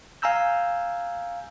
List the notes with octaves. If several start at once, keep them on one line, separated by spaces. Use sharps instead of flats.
F5 G#5 A#5 E6 G6